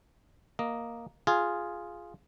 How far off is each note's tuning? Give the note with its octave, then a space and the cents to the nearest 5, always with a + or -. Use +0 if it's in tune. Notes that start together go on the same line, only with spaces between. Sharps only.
A#3 +0 D#5 +0
F4 +0 G#4 +0